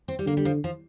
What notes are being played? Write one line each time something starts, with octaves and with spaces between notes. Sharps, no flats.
C4
G3
D3 A#3
G3
F3
F3